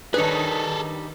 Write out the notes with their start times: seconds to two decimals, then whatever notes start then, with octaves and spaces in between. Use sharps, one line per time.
0.14 D#3 G3 D4 D#4 G#4 A4 B4 C#5